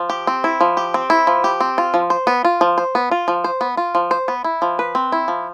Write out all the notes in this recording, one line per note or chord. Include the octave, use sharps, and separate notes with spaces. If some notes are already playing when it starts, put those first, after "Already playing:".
Already playing: F3
G4
C4
E4
F3
G4
C4
E4
F3
G4
C4
F4
F3
C5
B3
F4
F3
C5
B3
F4
F3
C5
B3
F4
F3
C5
B3
E4
F3
B4
C4
E4
F3